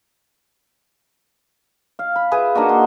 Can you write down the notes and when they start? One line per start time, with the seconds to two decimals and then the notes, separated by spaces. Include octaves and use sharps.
1.99 F5
2.16 B5
2.31 F4 G#4 B4 E5
2.55 A#3 D4 D#4 F#4
2.69 C6